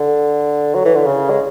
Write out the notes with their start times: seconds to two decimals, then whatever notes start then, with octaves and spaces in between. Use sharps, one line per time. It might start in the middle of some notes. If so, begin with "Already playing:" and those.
Already playing: D3
0.75 F#3
0.85 E3
0.96 D3
1.06 C#3
1.30 G#3